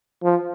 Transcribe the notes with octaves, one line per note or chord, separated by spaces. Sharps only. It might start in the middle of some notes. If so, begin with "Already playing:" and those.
F3